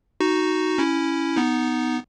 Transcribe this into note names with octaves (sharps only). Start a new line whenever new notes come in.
D#4 F#4
C#4 E4
B3 D#4